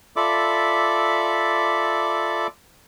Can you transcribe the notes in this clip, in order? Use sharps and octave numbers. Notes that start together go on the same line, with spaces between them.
F4 A4 D5 E5 B5 D6